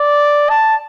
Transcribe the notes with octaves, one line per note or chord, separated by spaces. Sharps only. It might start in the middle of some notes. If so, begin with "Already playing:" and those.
Already playing: D5
A5